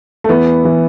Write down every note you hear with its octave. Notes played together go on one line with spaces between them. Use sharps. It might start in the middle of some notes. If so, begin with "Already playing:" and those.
A3
E3 B3
E3